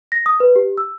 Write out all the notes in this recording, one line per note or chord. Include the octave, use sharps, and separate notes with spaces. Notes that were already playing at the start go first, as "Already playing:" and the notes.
A#6
D#6
B4
G4
E6